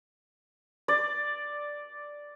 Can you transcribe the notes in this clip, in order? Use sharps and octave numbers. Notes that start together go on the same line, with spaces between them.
D5